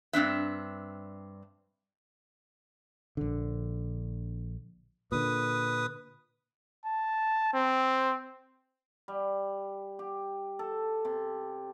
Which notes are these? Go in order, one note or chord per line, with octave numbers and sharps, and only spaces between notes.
G2 C4 D4 E5
A#1 D3
A#2 D3 B4 D#6
A5
C4
G3
G4
A4
C3